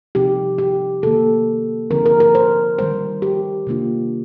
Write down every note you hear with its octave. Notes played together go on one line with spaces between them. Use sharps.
C3 F3 C4 D#4 G4
G4
C3 D#3 A#3 A4
D3 F3 C4 D#4 A#4
A#4
A#4
C5
D#3 G3 C4 C5
G4
C3 D#3 A#3 D4 F4